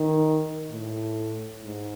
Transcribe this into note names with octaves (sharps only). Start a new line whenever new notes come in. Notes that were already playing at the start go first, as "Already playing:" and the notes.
Already playing: D#3
A2
G#2